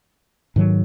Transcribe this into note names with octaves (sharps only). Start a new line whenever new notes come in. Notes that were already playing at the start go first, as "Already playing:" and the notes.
G#2 D#3 F#3